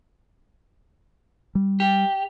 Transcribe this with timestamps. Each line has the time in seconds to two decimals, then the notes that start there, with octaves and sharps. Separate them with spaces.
1.55 G3
1.80 G4